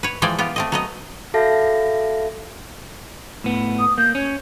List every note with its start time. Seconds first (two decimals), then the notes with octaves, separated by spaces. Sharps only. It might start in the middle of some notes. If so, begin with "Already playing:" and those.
0.03 B4 C#5
0.22 E3 F3 G#3 D5 G5 G#5
0.39 B3 F4 G4
0.56 A3 C4 D#5
0.72 F#3 B3 D#5
1.34 F#4 A4 E5 F5 A5 A#6
3.44 A2 B3
3.79 D#6
3.98 A#3 G6
4.15 C#4 C#5